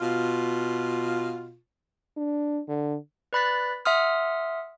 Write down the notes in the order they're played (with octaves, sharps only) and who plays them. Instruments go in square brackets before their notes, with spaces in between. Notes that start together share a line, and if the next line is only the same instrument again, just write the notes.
[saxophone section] B2 F4
[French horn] D4
D3
[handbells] B4 D5 B5 F#6 A6 B6
E5 F#5 C6 D#6 F6